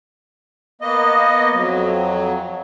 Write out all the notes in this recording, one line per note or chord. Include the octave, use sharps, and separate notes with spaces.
A#3 B3 D#5
F2 F#3